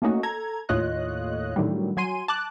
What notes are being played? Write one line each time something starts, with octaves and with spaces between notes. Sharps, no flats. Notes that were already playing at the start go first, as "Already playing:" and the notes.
A3 A#3 C#4 D#4 F#4
A4 A#5 G#6
D#2 A2 F4 C#5 D#5 F#6
A2 D3 D#3 F#3 G3
F#3 G#5 C6 D#7
A5 D6 F#6